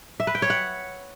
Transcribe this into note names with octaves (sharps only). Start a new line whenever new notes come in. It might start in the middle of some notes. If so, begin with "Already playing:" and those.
E5
B4
G5
C#5
F#5